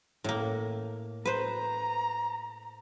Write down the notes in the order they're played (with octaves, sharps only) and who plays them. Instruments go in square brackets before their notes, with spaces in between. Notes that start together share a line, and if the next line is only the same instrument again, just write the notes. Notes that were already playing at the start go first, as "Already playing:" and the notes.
[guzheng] A2 A#3
[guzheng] B4 C5 [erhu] A#5